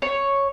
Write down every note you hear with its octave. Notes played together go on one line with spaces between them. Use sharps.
C#5